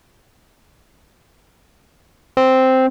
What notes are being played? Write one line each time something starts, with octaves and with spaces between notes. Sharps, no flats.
C4